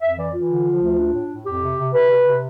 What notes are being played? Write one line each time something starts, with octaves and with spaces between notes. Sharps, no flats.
F2 E5
E3 D5
E3 F4
D3
F3
D2
D4
A2
A2
F2 G4
C3
C3
C3 B4
C3
C3